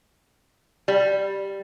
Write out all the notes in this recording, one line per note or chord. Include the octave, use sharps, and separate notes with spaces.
G3